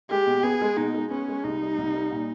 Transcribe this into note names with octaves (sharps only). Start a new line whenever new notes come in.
G#3 G4
B2
B3 G#4
G#3
B2 D#4
G#3
B3 C#4
G#3
C2 D#4
G3
C2
G3
A#2